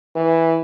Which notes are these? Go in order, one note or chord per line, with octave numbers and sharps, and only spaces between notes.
E3